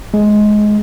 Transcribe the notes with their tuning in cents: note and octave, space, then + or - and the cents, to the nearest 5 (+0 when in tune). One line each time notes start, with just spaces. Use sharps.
G#3 +15